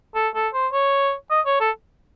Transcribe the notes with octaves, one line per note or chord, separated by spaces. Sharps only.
A4
A4
C5
C#5
D#5
C#5
A4